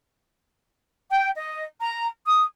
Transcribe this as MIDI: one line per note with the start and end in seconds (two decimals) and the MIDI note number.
1.09 1.29 79
1.37 1.64 75
1.80 2.07 82
2.25 2.44 87